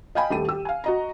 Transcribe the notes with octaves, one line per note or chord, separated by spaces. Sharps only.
D#5 F5 G5 G#5 B5
D#1 A3 G4 D#7
G4 E6
F5 G#5
F#4 D#5 A#5